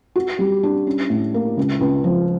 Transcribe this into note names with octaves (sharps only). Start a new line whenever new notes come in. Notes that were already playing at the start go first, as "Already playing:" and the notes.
F#4
G3
D4
C#4
A2
A#3
C#2
C#2
F3